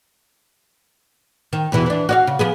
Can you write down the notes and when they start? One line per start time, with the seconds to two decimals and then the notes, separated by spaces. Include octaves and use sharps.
1.53 D#3
1.72 E2 B2 E3
1.86 E3 D4
2.09 F#4 D5 F5
2.27 C#3
2.39 F3 B3 G#4